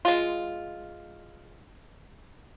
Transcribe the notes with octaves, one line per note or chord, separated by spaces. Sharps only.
G#3 F4